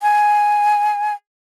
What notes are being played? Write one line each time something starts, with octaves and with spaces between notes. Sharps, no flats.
G#5